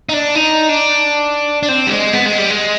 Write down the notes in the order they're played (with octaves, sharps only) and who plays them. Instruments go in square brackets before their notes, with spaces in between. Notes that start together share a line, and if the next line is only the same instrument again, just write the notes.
[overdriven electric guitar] D#4
D4
D#4
D4
D4
C4
G3
G#3
B3
G#3
G3
G#3